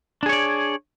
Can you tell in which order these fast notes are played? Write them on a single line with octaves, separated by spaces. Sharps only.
D4 G#4 C#5 D5